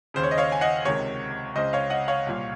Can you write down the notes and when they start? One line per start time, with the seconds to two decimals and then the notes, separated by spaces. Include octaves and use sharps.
0.14 D#2 C#3 C5
0.23 C#5
0.31 D#5
0.38 C#5 F5
0.52 G#5
0.61 D#5 F#5
0.85 C#2 C3 D#3 C#5
1.56 C#2 C#3 C5 D#5
1.73 C#5 F5
1.90 D#5 F#5
2.08 C#5 F5
2.26 C2 A#2